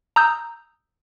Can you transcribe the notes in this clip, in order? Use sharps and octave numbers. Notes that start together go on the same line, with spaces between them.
A#5 D#6 E6 G6